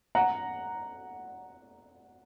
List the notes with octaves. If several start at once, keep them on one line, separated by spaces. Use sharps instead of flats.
F#5 A#5